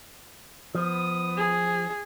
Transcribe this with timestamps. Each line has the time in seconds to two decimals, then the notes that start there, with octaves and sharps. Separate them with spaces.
0.75 F3 B3 D#6
1.37 G#4